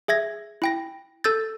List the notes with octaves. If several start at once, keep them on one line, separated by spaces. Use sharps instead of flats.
G#4 E5 G#6 A#6
E4 G5 A#6
A4 E6 G6 A6